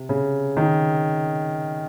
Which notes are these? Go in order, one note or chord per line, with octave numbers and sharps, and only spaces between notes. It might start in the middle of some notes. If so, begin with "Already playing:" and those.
Already playing: C3
C#3
D#3